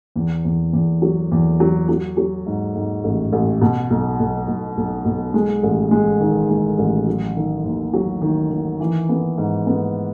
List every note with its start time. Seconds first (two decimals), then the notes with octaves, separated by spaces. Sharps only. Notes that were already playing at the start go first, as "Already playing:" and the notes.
0.16 E2
0.45 E2
0.73 E2
1.02 F#3
1.31 E2
1.60 F#3
1.89 F#3
2.17 F#3
2.46 G#2
2.75 G#2
3.04 A1
3.33 A1
3.61 B2
3.90 B1
4.19 B1
4.48 B1
4.77 B1
5.05 B1
5.34 G#3
5.63 A1
5.91 G#3
6.20 D#3
6.49 G#3
6.79 A1
7.07 F#3
7.36 D#3
7.65 D#2
7.93 F#3
8.22 D#3
8.52 D#3
8.80 E3
9.09 B3
9.38 G#2
9.67 B3